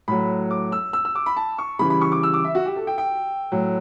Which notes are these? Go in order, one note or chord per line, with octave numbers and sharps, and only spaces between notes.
A2 F#3 B5
D6
E6
E6
E6
D6
B5
A5
C#6
C#3 E3 G3 B5
B5
C#6
D6
E6
D6
E5
F#4
G4
A4
G5
G5
A2 F#3